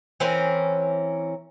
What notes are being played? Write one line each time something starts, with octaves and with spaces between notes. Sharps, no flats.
E3 C4 C#4 A#4